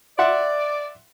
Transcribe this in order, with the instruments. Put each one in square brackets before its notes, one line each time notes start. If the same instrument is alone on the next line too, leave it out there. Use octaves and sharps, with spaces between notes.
[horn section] D5 [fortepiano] E5 F#5 C6